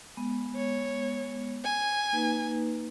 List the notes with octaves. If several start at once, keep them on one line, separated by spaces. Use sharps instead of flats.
G#3 B3
C#5
G#5
A#3 D#4 B4